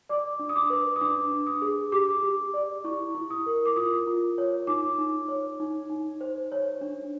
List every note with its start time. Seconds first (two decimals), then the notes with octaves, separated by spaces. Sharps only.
0.09 D5 D6
0.39 D4
0.49 D#6
0.56 D6
0.70 B4
0.96 D#6
1.01 D4 D6
1.32 D4
1.47 D#6
1.62 G#4
1.92 G4 D6
2.23 G4
2.54 D5
2.84 E4 C#6
3.15 E4
3.30 D#6
3.46 A#4
3.65 D6
3.76 F4 D#6
4.07 F4
4.38 C#5
4.67 D#4 D6
4.98 D#4
5.28 C#5
5.60 D#4
5.90 D#4
6.21 C5
6.52 C#5
6.81 D4